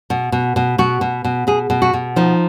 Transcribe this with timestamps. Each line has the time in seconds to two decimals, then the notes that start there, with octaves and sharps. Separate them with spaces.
0.10 B2
0.32 B2
0.56 B2
0.78 B2 F#4
1.01 B2
1.24 B2
1.47 B2 G#4
1.70 B2
1.82 F#4
1.93 B2
2.16 F3 D#4